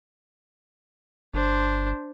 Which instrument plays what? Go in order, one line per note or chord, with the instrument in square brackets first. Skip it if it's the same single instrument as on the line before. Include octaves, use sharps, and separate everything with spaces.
[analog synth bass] G1 [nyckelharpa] D4 C5